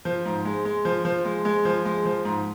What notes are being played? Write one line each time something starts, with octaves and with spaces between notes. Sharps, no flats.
F3
G#2
G#3
G#3
F3
F3
G#3
G#3
F3
G#3
F3
G#2